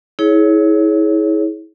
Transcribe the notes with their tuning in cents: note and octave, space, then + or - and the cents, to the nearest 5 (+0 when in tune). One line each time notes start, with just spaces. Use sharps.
E4 -35 G#4 +20 C#5 +0